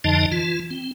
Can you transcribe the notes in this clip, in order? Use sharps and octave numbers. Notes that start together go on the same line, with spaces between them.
F2 D3 F3 D#4 D#5 A5
E3 F4
C4